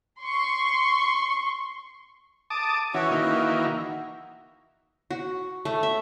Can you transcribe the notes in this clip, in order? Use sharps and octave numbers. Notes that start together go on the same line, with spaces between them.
C6 C#6
A5 D6 D#6
E3 C#4 F#4
D#3 E3 A#3
F#4
A3
E5